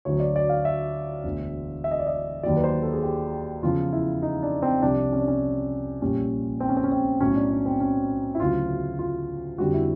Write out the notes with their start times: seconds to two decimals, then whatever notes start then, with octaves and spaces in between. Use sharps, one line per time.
0.05 D2 D3 F#3 C#5
0.20 D5
0.36 D5
0.49 F5
0.65 E5
1.24 E1 D2 D3
1.84 E5
1.91 D#5
1.99 D5
2.06 D#5
2.43 D#2 D#3 F#3 D5
2.57 B4
2.64 C5
2.82 A4
2.93 G#4
3.03 G4
3.62 E2 C#3 F3 F4
3.93 E4
4.23 D#4
4.43 D4
4.62 C4
4.82 C2 C3 F3 D4
5.12 C#4
5.19 D4
5.28 C#4
6.02 A#1 A#2 G3 C#4
6.60 C4
6.69 C#4
6.77 C4
6.84 C#4
6.92 C4
7.21 B1 A2 F#3 C#4
7.35 D4
7.50 D4
7.66 C4
7.80 C#4
8.35 E4
8.40 D2 C#3 F#3 F4
8.99 F4
9.58 F2 D3 G3 F#4
9.74 E4